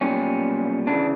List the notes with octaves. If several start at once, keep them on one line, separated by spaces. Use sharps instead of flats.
B1 A#2 G3 C#4
D2 C#3 E3 D4